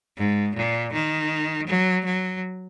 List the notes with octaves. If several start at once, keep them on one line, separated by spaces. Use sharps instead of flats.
G#2
A#2
D#3
F#3
F#3